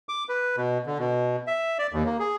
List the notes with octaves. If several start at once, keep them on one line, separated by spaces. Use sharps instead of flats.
D6
B4
B2
D3
B2
E5
D5
D#2
A#3
G#4